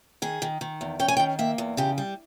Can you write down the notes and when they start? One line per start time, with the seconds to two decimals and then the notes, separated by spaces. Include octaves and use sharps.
0.22 D#3 G#4
0.42 D#3
0.61 D#3
0.81 E2
1.00 C#4 G5
1.08 G#5
1.17 G5
1.19 D#3
1.39 A#3 E5
1.58 E2
1.77 C#3 G4
1.98 G3